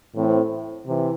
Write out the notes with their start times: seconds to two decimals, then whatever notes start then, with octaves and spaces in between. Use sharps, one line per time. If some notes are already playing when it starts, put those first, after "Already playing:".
0.15 A2 E3 A3 C4
0.85 C3 E3